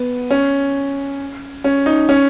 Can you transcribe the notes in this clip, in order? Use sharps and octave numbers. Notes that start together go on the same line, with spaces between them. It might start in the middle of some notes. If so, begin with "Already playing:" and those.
Already playing: B3
C#4
C#4
D#4
C#4